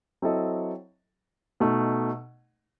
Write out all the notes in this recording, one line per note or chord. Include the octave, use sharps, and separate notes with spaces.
F#3 C4 E4 A4 D#5
B2 A3 D#4